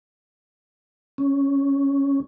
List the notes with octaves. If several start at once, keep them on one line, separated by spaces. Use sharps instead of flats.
C#4